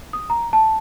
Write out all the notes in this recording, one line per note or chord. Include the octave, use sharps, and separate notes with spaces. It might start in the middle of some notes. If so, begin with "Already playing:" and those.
D#6
A#5
A5